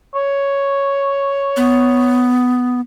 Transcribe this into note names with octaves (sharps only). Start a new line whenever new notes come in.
C#5
B3